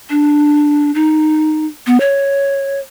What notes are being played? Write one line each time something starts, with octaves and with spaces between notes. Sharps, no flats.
D4
D#4
B3
C#5